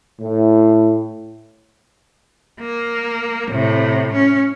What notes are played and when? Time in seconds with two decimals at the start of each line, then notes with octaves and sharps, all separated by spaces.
0.20 A2
2.60 A#3
3.51 A2 C3
4.13 C#4